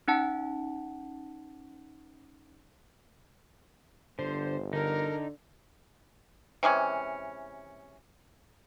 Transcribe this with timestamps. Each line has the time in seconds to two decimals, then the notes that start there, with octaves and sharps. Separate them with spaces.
0.08 C#4 D#4 F#5 A5
4.19 G1 D3 C5
4.73 D3 D#4 A#4
6.63 C3 E3 G#3 C#4